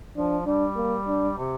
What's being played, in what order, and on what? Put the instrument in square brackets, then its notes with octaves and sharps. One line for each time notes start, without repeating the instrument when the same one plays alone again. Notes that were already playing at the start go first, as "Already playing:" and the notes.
[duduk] F3 [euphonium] D4
[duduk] G3 [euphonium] D4
[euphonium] A#3
D4
[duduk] C3